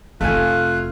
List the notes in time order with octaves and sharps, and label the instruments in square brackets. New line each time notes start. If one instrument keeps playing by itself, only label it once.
[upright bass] F1 [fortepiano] A3 G#5 [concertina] F4 F5 F#6